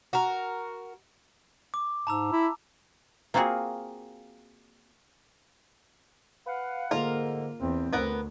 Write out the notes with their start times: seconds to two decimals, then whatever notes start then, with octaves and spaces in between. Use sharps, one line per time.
0.13 F#4 A#4
1.74 D6
2.07 G#2 A5 A#5 E6
2.32 E4
3.34 A#3 C4 F4 F#4 G#4
6.47 B4 F5 F#5
6.91 G#2 D3 A#3 F4 A#4
7.60 E2 C4
7.93 D2 B3 A#4 F#5